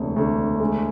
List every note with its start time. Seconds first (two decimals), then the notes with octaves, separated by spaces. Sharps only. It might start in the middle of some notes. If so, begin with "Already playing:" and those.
Already playing: E1 D2 C3
0.16 D2
0.60 G#3